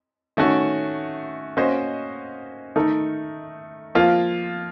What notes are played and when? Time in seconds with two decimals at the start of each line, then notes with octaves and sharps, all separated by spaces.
0.37 D#3 A3 C#4 F#4
1.57 A#3 C#4 F#4 C5 D#5
2.76 D#3 A3 D#4 A#4
3.95 F3 A#3 F4